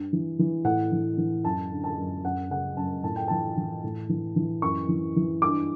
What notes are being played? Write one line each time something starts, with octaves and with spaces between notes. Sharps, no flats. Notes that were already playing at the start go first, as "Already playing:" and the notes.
Already playing: G2
E3
E3
A2 F#5
E3
E3
F#2 A5
D3
A5
F#2
F#2 F#5
C#3 F#5
F#2 A5
A2 A5
G5
E3 A5
E3
A2
E3
E3
F#2 C#6
E3
E3
G2 D6